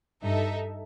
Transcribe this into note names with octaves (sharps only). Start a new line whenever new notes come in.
G2 D#4 A4 E5